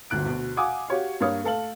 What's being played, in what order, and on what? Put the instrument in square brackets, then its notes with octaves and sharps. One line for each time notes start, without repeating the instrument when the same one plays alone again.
[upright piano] G1 D2 F#6 D7
D2 B2
F5 F#5 G#5 D6 D#6
F#4 G4 C#5 F5
G2 A#3 G4 C#5 F5 D#6
A3 A4 F5 F#7